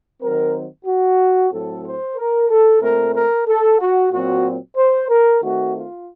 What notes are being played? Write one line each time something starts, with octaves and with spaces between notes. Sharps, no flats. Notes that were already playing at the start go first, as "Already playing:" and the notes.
D#3 F#3 C4 A#4
F#4
A2 F#3 C4 A4
C5
A#4
A4
A#2 A3 C4 A#4
A#4
A4
F#4
A#2 F#3 C4 F#4
C5
A#4
D#3 A3 C4 F#4
F4